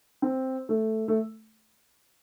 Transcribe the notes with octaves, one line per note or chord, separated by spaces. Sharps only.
C4
A3
A3